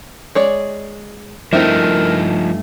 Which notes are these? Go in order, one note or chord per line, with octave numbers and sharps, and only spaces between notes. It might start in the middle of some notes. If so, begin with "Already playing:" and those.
G#3 C#5 D5
G2 F3 A3 C4 D#4 E4 A#4